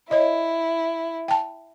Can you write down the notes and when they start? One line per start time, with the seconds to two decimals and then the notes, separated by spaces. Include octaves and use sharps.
0.11 E4 C#5 D#5
1.28 G5 A5